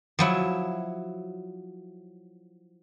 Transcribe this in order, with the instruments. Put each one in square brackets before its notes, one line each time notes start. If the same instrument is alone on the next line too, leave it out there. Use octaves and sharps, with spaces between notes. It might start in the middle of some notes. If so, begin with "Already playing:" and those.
[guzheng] F3 F#3 E4